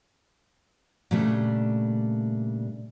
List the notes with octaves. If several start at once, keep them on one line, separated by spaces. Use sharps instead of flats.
A#2 C#3 G3 A3 D4